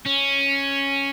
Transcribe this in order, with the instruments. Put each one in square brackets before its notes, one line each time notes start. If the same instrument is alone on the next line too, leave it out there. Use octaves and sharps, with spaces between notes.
[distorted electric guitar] C#4